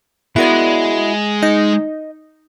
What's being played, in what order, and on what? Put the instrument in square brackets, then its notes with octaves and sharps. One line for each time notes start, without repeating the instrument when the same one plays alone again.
[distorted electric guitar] G#3 [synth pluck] B3 A#4 D5 [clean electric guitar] E4 F#4
[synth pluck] D#4 [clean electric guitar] D#5